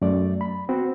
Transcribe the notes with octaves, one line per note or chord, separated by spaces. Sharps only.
F#2 A3 D5
B5
B3 C4 F#4